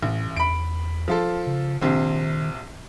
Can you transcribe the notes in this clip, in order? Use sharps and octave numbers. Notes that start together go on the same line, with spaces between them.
A1 A2
E2 B5 D7
F3 F4 A4
C#3
A#1 C3 D#3 C4